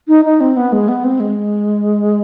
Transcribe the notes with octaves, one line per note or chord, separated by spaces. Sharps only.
D#4
D#4
C4
B3
G#3
B3
C4
G#3